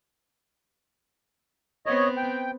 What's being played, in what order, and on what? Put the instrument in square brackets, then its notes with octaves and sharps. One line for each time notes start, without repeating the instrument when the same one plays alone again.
[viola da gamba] B3 C4 [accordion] C#5 D#5
[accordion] G5